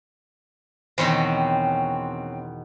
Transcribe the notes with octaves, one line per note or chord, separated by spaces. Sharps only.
E2 B2 D#3 C4 C#4